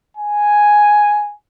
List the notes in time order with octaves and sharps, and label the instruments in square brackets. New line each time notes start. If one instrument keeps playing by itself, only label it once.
[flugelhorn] G#5